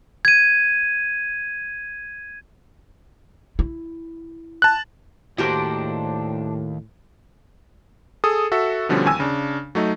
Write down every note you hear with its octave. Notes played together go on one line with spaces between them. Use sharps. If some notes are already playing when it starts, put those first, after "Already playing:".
G#6 D#7
E4
A5 F#6
D#2 A2 D4 F#4 G4 A#4 C5 D6
G#4 A4 D#6
F#4 A4 E5
B2 D3 F3 G3 C#4
D#2 G#5 E6
C#3 D4
F#3 A3 D#4